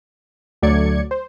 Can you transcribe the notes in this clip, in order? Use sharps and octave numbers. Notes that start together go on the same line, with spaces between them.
D2 F#3 A3 D5 G#6 C#7
C5